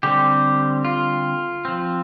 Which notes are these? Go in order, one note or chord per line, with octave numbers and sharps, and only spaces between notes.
D3 G3 C4 G4
F4
F3 C4